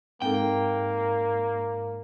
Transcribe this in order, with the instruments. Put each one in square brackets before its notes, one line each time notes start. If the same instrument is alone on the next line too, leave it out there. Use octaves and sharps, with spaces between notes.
[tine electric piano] G#2 [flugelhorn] A#3 [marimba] C4 D#4 A4 [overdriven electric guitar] G5